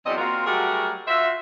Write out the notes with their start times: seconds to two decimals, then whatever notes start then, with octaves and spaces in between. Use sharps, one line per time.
0.06 E2 F#3 C4 D5 D#5
0.18 A#3 C4 F4 F#4 A#4
0.46 F#3 G3 A3 F#4 G#4 A#4
1.08 F4 F#4 C5 E5